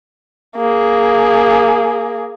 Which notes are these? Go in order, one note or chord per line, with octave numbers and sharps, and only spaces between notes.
A#3 G#4